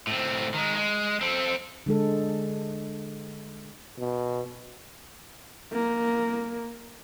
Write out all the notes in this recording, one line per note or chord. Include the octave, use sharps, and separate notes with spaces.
A2 C4
D#3 G#3
G#3
C4 A4
D3 G#3 A4
B2
A#3